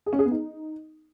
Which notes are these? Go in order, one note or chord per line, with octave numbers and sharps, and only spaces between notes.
G#4
C#4
G#4
B3
D#4